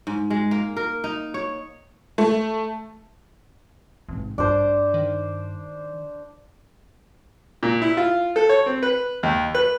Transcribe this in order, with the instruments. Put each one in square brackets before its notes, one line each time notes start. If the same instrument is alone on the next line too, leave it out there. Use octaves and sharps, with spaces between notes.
[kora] G#2
G#3
A#3
A#4
D#4
C#5
[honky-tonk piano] A3
[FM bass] A1 [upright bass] G#2 C4
[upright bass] G2 [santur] D4 C5
[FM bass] D#3
[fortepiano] A#2
E4
F4
A4
C#5
C4
B4
D#2
B4